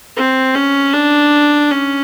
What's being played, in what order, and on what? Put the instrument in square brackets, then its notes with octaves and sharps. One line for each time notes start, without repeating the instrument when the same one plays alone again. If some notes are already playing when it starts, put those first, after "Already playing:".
[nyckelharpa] C4
C#4
D4
C#4